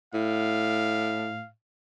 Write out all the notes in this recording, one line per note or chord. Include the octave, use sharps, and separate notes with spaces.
A2 F5